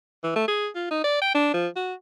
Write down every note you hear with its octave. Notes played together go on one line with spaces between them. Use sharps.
E3
A3
G#4
F4
D#4
D5
G5
D4
F3
F#4